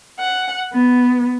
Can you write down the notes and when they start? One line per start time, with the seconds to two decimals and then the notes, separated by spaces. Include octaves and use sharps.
0.19 F#5
0.72 B3